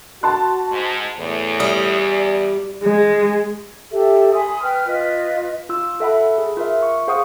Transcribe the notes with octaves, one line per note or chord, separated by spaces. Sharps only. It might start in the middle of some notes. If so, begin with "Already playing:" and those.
F#4 A5 C6 F#6
G#2
E2 A2
G3 D#6
D5
G#3
G4 A4 E5
G#5 B5 C6 D#6
B4 G5 F6
F4 B4 D#5
F4 E6
A4 E5 F#5 B5
G#4
F4 A#4 E5
C#6
G#4 C5 F5 F#5 C#6 D#6